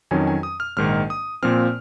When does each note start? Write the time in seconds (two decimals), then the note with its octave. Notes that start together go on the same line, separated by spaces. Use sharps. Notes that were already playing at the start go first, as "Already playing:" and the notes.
0.11 F2 D#3 F#3 C#4 G#5
0.27 G#5
0.43 D#6
0.60 F6
0.77 A#1 G#2 D#3 F6
1.10 D#6
1.43 A#2 F3 C4 F6